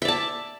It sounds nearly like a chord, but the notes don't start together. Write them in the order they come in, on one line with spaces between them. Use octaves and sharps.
E5 D5 A5